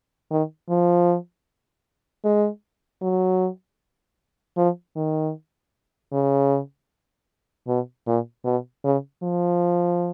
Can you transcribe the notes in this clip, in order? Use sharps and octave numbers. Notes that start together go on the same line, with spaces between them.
D#3
F3
G#3
F#3
F3
D#3
C#3
B2
A#2
B2
C#3
F3